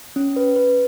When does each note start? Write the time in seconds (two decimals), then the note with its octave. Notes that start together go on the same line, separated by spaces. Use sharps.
0.16 C#4
0.36 B4
0.56 B4